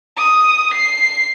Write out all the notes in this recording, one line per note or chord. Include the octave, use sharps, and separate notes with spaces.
D#6
C7